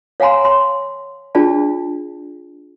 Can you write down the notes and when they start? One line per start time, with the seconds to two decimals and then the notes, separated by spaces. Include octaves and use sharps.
0.20 C#5 F5 F#5 G#5 A#5 C6
0.45 C6
1.35 D4 F4 G#4 D5 A5